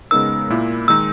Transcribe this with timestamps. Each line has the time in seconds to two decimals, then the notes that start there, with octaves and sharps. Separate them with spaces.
0.11 C#3 G#3 B3 D#4 A#4 E6
0.50 A#2 A#3 E4
0.88 D#3 G#3 D#4 E6